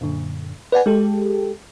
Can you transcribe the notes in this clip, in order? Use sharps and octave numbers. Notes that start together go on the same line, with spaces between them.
F#2 A#2 D3
B4 D5 F#5 G#5
G#3 G4 A4